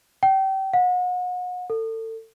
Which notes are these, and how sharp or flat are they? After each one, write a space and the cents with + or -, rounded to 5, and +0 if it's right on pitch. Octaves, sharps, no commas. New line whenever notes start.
G5 -30
F#5 -35
A4 +30